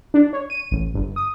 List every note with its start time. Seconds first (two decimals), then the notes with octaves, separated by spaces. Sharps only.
0.14 D4
0.33 C#5
0.50 D#7
0.71 A1
0.94 G1
1.16 D#6